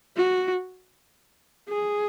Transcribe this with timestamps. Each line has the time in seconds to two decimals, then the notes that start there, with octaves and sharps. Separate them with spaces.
0.16 F#4
1.69 G#4